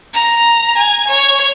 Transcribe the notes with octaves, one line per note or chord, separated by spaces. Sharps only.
A#5
G#5
C#5